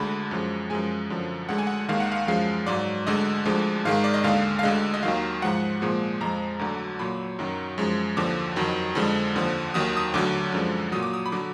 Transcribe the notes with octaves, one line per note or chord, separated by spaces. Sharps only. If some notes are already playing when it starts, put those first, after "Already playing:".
Already playing: D2 D3 G#3 B5
F#2 F3 G#3
F#2 F3 G#3 G#5
F#2 D3 F3
D2 D3 G#3 F#5
G#5
F#5
D#2 D#3 G#3 F5
F#5
F5
F#2 F3 G#3 F5
G#2 F#3 D5
D2 D3 G#3 D#5
D2 D3 F3 G#3
G#2 D#3 G#3 F5
D5
D#5
D#2 D3 G#3 F5
F5
D2 D3 G#3 D#5
D#5
D#2 D#3 F#3 F5
G#2 F3 G#3 F#5
A#2 F3 G#3
F2 F3 G#3 A#5
D2 D3 F#3
A#2 F#3 B5
F#2 D#3 F#3
F#2 F3 G#3
D#2 D3 F3 D6
F2 D#3 F#3
F2 D3 F3 G#3
D#2 D3 F3
D#2 D#3 F#3 D#6
D#6
D2 D3 F#3 D6
F#2 D3 F3 G#3
A#2 F#3 D#6
D6
D#6
B5
D3 F#3 D6